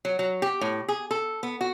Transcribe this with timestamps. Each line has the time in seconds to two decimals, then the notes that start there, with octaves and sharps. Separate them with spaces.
0.05 F#3
0.19 F#3
0.42 G4
0.61 A2
0.88 G#4
1.11 A4
1.43 B3
1.61 F#4